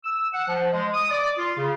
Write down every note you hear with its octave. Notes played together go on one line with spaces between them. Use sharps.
E6
F#5
F3
G#3
D#6
D5
F4
C#3